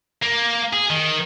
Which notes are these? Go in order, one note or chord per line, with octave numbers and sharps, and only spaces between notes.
A#3
G#4
D#3